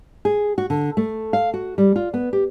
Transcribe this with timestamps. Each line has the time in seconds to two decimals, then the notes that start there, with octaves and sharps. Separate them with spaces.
0.25 G#4
0.58 F#4
0.70 D3
0.97 A3
1.33 F5
1.54 F#4
1.78 G3
1.96 F4
2.14 B3
2.33 G4